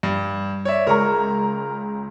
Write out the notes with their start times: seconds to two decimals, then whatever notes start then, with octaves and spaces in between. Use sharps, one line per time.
0.03 G2
0.65 C#5 D5 E5
0.87 C#2 A#4 A#5 C#6